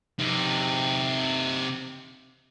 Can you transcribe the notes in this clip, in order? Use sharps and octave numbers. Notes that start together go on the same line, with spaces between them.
C3 D#4